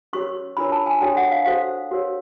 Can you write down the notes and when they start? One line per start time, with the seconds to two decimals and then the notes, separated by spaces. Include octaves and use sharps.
0.13 C#4 F#4 A#4 C#5 C#6
0.57 D4 F4 A#4 C#5 B5
0.72 A5
0.86 G#5
1.01 D4 F#4 A4 C#5 G5
1.17 F#5
1.32 F5
1.46 F#4 A4 C5 F5
1.91 F#4 A#4 C#5